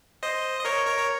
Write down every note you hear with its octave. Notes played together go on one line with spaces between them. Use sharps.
C5 D#5
D#5
A#4 C#5
A#4 C#5
C#5